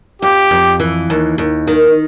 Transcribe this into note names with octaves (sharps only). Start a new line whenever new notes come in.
F2 G4
F2
E3
D#2
D#2
D#3